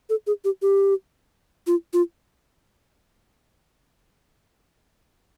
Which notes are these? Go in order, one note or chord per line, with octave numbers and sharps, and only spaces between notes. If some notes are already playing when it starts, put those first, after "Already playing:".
A4
G#4
G4
G4
F4
F4